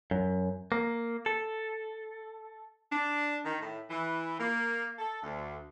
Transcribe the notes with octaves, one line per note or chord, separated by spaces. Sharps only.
F#2
A#3
A4
D4
D#3
A2
E3
A#3
A4
D2